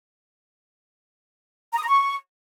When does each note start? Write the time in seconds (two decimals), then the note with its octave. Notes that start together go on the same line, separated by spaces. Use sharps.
1.74 A#5
1.79 D#6
1.84 A#5
1.89 C#6